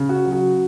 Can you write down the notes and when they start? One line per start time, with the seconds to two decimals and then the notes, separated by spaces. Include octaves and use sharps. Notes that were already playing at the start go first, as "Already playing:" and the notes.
Already playing: C#3
0.09 F#4
0.25 F#3
0.32 F#4